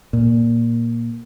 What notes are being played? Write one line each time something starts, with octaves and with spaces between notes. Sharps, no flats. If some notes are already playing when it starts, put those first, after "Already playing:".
A#2